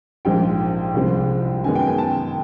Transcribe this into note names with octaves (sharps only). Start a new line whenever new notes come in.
A#1 G#2 F3 G#3 G5
C2 C3 F3 G#3 C4
F#2 D#3 G#3 B3 G#5
G5
G#5
A5